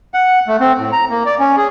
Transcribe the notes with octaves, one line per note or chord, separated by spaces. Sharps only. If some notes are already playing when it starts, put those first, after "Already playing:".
F#5
A3
C4
A2
A#5
A#3
D5
C#4
G#4